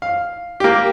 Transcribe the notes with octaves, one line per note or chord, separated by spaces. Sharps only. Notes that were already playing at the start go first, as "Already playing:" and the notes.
F5
A#3 G4